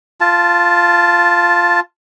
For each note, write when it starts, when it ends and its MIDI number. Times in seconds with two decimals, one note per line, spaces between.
0.20 1.80 65
0.20 1.80 81